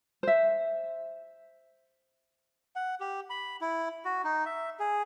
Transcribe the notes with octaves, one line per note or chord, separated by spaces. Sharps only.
C5 E5
F#5
G4
B5
E4
F#4
D#4
E5
G#4